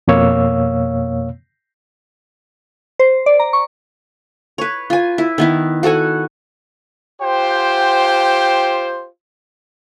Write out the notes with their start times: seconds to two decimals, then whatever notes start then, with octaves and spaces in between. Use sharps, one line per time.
0.08 F2 B2 A#3 C#5 F5 E6
2.99 C5
3.26 D5
3.40 A#5
3.53 C#6
4.58 B4 C#5
4.90 F4 G#5
5.18 E4
5.38 D#3 B3 E4
5.83 F#4 A4 F#5 G#5
7.21 F4 G4 C5 G5